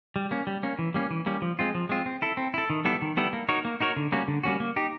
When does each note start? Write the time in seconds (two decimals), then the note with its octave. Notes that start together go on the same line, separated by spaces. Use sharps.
0.16 G3
0.31 A#3 C#4
0.47 G3
0.63 A#3 C#4
0.79 E3
0.94 G3 A#3 C#4
1.11 E3
1.26 G3 A#3 C#4
1.42 F3
1.59 G#3 C4 F4
1.75 F3
1.89 G#3 C4 F4
2.06 C4
2.22 E4 A4
2.37 C4
2.54 E4 A4
2.70 D#3
2.85 G3 B3 E4 A4
3.02 D#3
3.17 G3 B3 E4 A4
3.33 A#3
3.49 D#4 F#4 A#4 C#5
3.65 A#3
3.80 D#4 F#4 A#4 C#5
3.97 D3
4.12 G3 A#3 C#4 F#4
4.28 D3
4.43 G3 A#3 C#4 F#4
4.60 A#3
4.76 D#4 G4